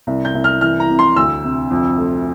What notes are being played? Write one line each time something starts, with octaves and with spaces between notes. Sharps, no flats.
C2
G6
C2
F6
E3 F6
A#5
C3
C6
D2 E6
C3
F2
A3